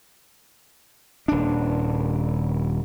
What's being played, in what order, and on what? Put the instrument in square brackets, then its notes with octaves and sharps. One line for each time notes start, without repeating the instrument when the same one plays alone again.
[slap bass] D#1 D4